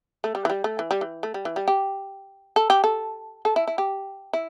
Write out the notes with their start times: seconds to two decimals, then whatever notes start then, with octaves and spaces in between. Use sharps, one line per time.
0.24 A3
0.35 G3
0.45 E3
0.50 G3
0.64 A3
0.79 E3
0.91 G3
1.01 E3
1.23 A3
1.34 G3
1.45 E3
1.56 G3
1.68 G4
2.56 A4
2.70 G4
2.84 A4
3.45 A4
3.56 E4
3.67 E4
3.78 G4
4.33 E4